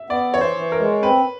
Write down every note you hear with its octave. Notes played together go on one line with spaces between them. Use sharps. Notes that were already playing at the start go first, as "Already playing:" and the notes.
Already playing: E5
B3 D5
E3 C#5
C5
E3
A#4
G#3
C4 B4